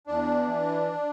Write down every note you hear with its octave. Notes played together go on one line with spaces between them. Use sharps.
E2 D4
E3